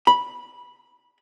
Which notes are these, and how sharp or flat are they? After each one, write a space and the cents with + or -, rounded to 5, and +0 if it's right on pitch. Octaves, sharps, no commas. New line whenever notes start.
B5 -10